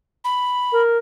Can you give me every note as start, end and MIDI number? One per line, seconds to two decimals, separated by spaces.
0.24 0.82 83
0.73 0.98 70